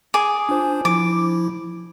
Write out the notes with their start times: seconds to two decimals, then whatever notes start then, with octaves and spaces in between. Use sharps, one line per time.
0.14 G#4 D6
0.49 D4 F4 C5
0.85 F3 E4 D6